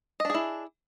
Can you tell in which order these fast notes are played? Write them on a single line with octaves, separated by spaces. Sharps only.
D#5 D4 G#4 E4